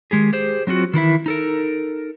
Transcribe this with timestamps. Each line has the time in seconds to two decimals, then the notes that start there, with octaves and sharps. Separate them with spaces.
0.11 D#3 G#3 G4 G#4
0.33 G4 G#4 C5
0.67 F#3 C4 F4 F#4
0.94 D#3 E3 E4 E5
1.26 D#4 A4 A#4